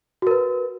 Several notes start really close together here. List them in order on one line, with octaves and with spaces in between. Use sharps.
F#4 A#4 B4